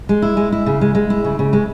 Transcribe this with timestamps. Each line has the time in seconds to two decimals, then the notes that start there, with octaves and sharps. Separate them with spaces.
0.09 G#3
0.22 E4
0.37 G#3
0.52 E4
0.66 C#3
0.81 G#3
0.95 G#3
1.10 E4
1.24 C#3
1.39 C#3
1.53 G#3